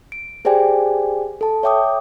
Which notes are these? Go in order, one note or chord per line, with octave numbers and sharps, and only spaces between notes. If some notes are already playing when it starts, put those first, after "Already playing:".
D7
G4 G#4 C5 D5 G5 G#5
A4 A5
C#5 E5 G5 D6 D#6